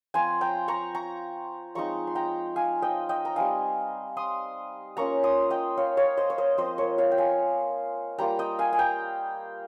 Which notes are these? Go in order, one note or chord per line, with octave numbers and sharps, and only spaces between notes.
F3 C4 F4 G#5 C6
G5 A#5
A#5 C#6
A#5 C#6
F3 G#3 C4 D#4 A#5 C#6
C6
G5 A#5
F5 G#5
D#5 G5
D#5 G5
A#5
G3 C4 D#4 F5 G#5
C6 D#6
A#3 C#4 F4 A#5 C#6
C6 D#6
D#5 G5
C#5 F5
C#5 F5
C5 D#5
C#5
C5 D#5
F3 C4 F4 C5 D#5
A#4 C#5
C#5 F5
G5
F5 G#5
G3 A#3 F4 G5 A#5
D#5 G5
F5 G#5
G#5
G5 A#5